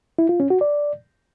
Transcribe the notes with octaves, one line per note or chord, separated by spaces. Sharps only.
E4
F4
C#4
F#4
D5